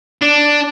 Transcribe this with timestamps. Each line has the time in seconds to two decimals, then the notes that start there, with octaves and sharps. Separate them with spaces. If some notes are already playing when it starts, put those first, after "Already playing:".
0.22 D4